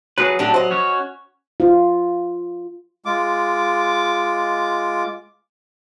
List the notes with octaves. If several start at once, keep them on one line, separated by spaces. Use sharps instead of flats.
F#3 G#4 B4
A2 F#3 D4 G4
C5 D#5
C#4 F#4 C#5
F4
G#3 F4 D6